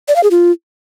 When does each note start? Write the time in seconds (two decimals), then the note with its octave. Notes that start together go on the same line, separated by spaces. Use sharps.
0.08 D5
0.16 F5
0.23 G#4
0.31 F4